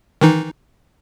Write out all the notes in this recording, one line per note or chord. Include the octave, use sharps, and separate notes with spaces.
D#3 E3 D#4